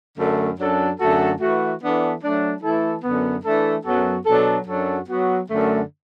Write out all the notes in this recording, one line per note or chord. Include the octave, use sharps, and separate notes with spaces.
F#2 D3 A3
F#2 F#3 D4 A4
F#2 D3 A3 F#4 A4
E3 A3 F#4
E3 B3 D4 A4
F#3 A3 D4
E3 A3 E4 A4
F#2 D3 B3
E3 A3 D4 A4
F#2 F#3 B3 F#4 A4
B2 F#3 D4 A4
F#2 F#3 D4 F#4 A4
F#3 B3 F#4
F#2 D3 A3